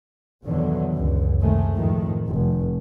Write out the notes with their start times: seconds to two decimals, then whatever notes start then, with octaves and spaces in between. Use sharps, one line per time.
0.45 E2 B2 D3 D#3 F#3
0.93 C#2 F#2
1.41 C3 D#3 G#3 A3
1.76 F2 A2 D#3
2.28 F1